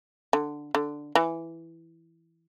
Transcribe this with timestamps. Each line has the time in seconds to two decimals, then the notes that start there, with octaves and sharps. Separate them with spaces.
0.33 D3
0.75 D3
1.15 E3